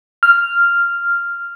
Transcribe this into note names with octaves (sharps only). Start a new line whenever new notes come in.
F6